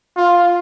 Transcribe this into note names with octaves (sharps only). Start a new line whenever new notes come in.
F4